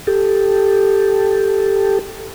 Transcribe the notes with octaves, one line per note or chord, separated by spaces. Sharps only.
G4 A4